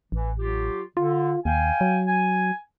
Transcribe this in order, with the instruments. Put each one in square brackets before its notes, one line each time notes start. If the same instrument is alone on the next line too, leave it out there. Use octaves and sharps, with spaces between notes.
[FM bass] A1 [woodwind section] E3
[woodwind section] F#3 F4 G4
[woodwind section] D3 [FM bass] F4
[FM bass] D#2 [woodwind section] F5 G5 G#5
[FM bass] F#3
[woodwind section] G#5